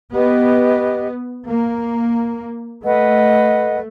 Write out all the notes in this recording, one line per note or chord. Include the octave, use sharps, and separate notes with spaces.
B3 G4 B4 D#5
A#3
A3 B4 D#5 F#5